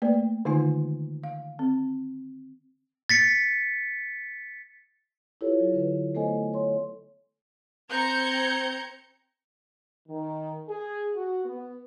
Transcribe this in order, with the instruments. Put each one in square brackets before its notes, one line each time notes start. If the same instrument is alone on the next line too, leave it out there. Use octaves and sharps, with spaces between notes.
[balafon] A3 A#3 B4 D5
D3 D#3 G#3 D#4 F4 G#5
F5
C4
[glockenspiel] A6 B6 C#7
[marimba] E4 F4 G4 A4 B4 C#5
F#3
D3 B4
A3 B3 A4 C5 D#5 G#5
C#5 C6
[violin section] C4 A#5 G6 G#6 C#7
[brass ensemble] D#3
G#4
F#4
B3